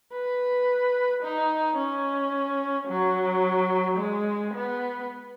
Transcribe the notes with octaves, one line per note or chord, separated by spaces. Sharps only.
B4
D#4
C#4
F#3
G#3
B3